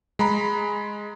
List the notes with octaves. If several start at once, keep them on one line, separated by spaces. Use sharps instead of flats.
G#3 A#5 B5